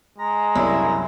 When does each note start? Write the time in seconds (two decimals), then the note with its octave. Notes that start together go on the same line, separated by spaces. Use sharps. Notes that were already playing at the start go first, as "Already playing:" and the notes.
0.19 G#3 A#5
0.55 C2 F#2 E4 C#5